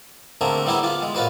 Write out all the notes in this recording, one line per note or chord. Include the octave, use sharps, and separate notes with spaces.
D3 A3 A#3 C4 G#4
G3 B3 E4 G4 G#4 E5
F4 G4
G#3
A#2 F4 F#4 B4 C5